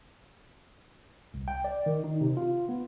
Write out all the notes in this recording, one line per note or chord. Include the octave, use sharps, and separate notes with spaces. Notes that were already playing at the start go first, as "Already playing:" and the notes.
C2
G5
D5
D#3
D#4
C3
F4
B3